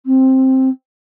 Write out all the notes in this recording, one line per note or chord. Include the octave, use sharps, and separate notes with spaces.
C4